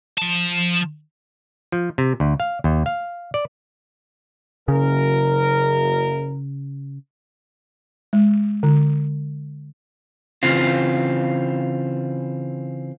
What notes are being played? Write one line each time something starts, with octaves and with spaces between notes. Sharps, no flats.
F3 A5
F3
C3
D2
F5
D#2
F5
D5
F#1 C#3 A#4
G#3
D3
C#3 E3 C4 F4